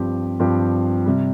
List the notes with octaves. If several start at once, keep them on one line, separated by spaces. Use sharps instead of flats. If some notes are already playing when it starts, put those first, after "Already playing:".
Already playing: G2 F3 C4 G4
G2 F3 C4 G4
C3 G3